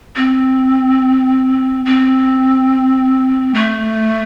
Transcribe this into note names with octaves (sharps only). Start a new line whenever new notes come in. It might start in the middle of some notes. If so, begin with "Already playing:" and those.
C4
C4
A3